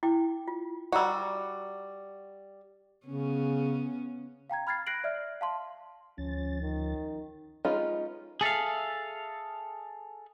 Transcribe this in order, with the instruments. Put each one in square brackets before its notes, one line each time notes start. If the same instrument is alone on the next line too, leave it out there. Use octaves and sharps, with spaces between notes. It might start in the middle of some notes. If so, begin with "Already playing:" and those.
[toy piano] E4 G5 D6
F4
[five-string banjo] G3 F#4 [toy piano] D5 A#5 E6
[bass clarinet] C#3 [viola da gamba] B3 C#4
[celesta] F5 G5 A#5 G#6
B5 F6 G#6 A6 C7
F#6 A#6 C7 D7 F#7
D5 E5 F6
F5 A5 C6
[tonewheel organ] D2 F3 A6 [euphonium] C#4
[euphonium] D#3
[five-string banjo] G#3 C#4 D#4 F4 B4
[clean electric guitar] G#4 A4 E5 F5